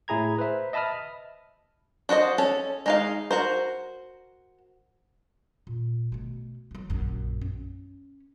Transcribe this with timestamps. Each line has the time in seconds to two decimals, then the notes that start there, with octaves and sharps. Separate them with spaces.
0.08 A2 E4 G#4 A#5 G#6
0.38 B4 C5 E5
0.73 D#5 E5 A5 B5 D#6 F6
2.09 D4 F#4 C5 D#5
2.38 C#4 A4
2.86 G#3 D#4 F5
3.31 F#4 A#4 C5
5.67 A#2
6.12 B2 A3
6.71 E3 F#3
6.90 A#1 F#2
7.41 C#4